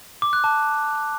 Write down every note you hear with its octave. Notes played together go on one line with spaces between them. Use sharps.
D6
F#6
A5